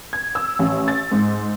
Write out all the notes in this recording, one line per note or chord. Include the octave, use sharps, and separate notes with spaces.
G#6
E6
A1
A6
G#2